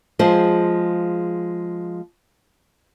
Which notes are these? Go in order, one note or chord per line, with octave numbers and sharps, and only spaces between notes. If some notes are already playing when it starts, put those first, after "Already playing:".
F3 G#3 G#4 C5